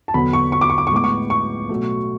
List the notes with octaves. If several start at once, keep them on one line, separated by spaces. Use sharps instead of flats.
A5
E2 D3 F#3 B3 B5
C#6
C#6
D6
C#6
D6
C#6
A2 G#3 B3 D6
C#6
C#6
B2 F#3 A3